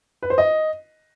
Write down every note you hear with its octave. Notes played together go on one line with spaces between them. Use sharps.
B4
C5
D#5